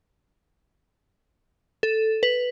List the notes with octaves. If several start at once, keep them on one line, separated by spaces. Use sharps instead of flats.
A4
B4